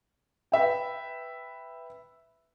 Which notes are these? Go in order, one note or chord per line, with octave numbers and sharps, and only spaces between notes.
B4 E5 G5